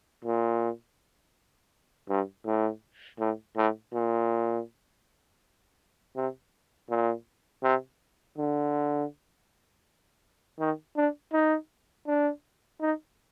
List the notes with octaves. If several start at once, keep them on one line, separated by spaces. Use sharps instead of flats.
A#2
G2
A2
A2
A2
A#2
C3
A#2
C3
D3
D#3
D4
D#4
D4
D#4